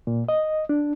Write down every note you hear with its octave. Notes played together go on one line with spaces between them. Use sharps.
A#2
D#5
D4